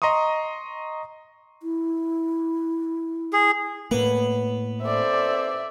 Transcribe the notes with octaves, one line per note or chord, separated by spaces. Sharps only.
D#5 A#5 C6 C#6 D#6
E4
G#4
A2 A#3 B3
C4 A4 C5 D5 E5